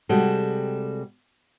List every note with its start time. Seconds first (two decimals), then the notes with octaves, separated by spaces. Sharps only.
0.09 C3 G3 G#3 F#4 A4